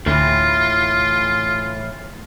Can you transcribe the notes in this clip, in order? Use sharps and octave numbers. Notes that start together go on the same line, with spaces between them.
D2 A2 E3 F4